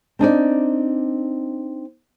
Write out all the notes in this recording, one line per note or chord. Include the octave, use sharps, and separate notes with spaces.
C4 D4 D#4 D5